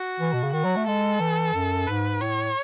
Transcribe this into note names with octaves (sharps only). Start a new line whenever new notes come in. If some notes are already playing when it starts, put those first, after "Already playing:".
Already playing: F#4
E3
B2
C#3
D#3 F#4
F#3
A3
G#3 A4
E3
F#2
G#2 B4
A2 C#5